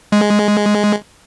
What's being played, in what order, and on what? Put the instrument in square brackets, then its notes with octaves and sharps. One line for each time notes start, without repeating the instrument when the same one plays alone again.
[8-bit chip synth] G#3